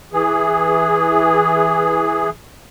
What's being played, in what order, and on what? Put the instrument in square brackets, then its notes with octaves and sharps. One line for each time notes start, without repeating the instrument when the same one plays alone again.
[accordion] E3 G#4